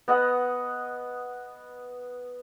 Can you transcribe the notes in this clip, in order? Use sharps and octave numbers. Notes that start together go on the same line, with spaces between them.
B3 D#5 F#5